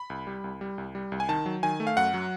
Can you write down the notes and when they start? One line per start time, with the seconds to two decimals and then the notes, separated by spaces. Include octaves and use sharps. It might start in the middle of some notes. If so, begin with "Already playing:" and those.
Already playing: B5
0.10 C2
0.27 G3
0.44 C2
0.61 G3
0.78 C2
0.95 G3
1.12 C2
1.20 G#5
1.29 D#3 A5
1.46 F#3
1.63 D#3 G#5
1.80 A3
1.87 F5
1.97 F#2 F#5
2.14 F#3